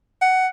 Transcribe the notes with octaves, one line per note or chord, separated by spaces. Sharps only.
F#5